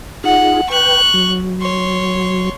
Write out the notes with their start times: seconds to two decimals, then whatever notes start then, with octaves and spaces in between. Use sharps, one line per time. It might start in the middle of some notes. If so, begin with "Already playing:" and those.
0.24 D#4 F4 G#4 F#5
0.69 B4 G5 C#6 F#6
1.14 F#3
1.61 C#5 C6